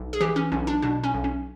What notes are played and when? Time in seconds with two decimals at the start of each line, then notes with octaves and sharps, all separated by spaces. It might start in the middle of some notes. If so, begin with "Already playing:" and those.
Already playing: B1
0.13 G#4
0.21 E3 G4
0.36 C#4
0.52 B1 C#4
0.67 D4
0.82 B2 D4
1.03 C#4
1.14 B1
1.24 C#4